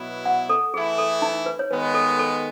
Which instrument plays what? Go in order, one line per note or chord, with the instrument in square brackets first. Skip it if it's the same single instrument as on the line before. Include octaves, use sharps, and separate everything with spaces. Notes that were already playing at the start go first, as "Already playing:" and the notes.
Already playing: [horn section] B2 F#3 B3 E4
[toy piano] F#5
A4
[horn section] E3 A3 E4 [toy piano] G#4
[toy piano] A4
D#4
B4
C#5
[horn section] D#3 G#3 B3 [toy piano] B4
[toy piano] A4
A4